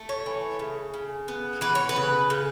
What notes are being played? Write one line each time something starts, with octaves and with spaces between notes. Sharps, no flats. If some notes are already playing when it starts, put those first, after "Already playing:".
Already playing: A3
C#5
E3
C#3
C#3
B3
E3 B4
C#5
B4
C#3
C#3